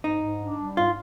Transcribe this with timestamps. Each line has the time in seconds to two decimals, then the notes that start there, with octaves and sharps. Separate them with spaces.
0.03 G#2 D#4
0.21 G#2
0.41 D4
0.58 G3
0.77 G#2 F4